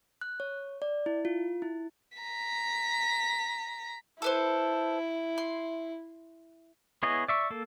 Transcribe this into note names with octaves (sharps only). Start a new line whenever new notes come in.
F#6
C#5
D5
E4
F4
E4
A#5 B6
E4 A4 B4 C5
C6
B3 E4 G#4 C#5 D#5
D5 E5 C#6
A#3 A4